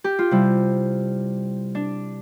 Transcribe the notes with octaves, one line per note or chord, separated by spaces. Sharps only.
G4
F4
C3 G3 E4
D4